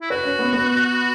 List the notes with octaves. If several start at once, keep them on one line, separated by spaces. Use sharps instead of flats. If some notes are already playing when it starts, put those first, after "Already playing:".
E4
F#4 B4
C#4
B3
B3